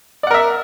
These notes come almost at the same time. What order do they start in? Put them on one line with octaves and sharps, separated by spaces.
D5 F#5 A#4 E5